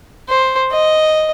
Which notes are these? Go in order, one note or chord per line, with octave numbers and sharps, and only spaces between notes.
C5
D#5